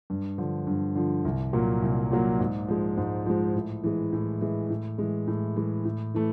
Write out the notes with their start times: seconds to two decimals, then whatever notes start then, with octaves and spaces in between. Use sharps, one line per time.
0.10 G2
0.38 D3 F3
0.67 G2
0.96 D3 F3
1.25 C2
1.53 A#2 F#3 A#3
1.82 C2
2.11 A#2 F#3 A#3
2.39 G#2
2.68 F3 G#3
2.97 G#2
3.26 F3 G#3
3.55 A2
3.84 E3 G#3
4.13 A2
4.41 E3 G#3
4.70 A2
4.98 E3 G#3
5.27 A2
5.56 E3 G#3
5.85 A2
6.14 E3 A3